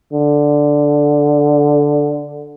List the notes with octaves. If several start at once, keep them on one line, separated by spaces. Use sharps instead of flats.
D3